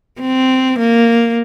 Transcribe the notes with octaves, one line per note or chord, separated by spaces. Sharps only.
C4
A#3